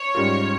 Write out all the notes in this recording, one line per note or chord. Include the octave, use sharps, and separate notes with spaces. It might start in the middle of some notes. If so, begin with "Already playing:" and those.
Already playing: C#5
G#2 G3 C#4 F4 A#4